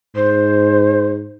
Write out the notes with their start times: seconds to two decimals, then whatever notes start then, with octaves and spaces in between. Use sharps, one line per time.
0.16 G#2 C5